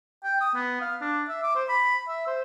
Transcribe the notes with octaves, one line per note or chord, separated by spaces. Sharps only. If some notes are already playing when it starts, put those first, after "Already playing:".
G5
D#6
B3
F5
D4
E5
D6
C5
B5
E5
C5